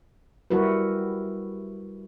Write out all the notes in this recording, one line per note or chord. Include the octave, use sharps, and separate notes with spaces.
G3 E4 F#4 A#4 B4